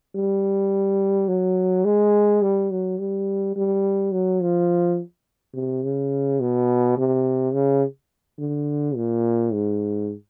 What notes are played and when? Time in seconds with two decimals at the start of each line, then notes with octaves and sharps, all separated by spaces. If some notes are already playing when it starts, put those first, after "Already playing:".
0.15 G3
1.28 F#3
1.85 G#3
2.42 G3
2.71 F#3
2.99 G3
3.56 G3
4.12 F#3
4.41 F3
5.54 C3
5.83 C#3
6.40 B2
6.97 C3
7.53 C#3
8.39 D3
8.96 A#2
9.53 G#2